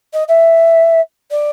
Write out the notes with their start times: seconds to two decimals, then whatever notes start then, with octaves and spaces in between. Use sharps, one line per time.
0.13 D#5
0.28 E5
1.31 D5